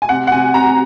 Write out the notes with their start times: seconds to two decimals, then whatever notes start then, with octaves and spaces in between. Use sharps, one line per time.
0.02 G#5
0.09 C3 F#5
0.27 F#5
0.31 C3 G#5
0.54 C3 A#5